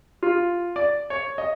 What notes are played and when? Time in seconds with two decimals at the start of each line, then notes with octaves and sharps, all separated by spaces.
0.23 F4
0.76 D5
1.10 C#5
1.38 D#5